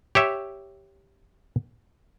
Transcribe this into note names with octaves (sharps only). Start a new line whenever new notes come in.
G4 C#5 E5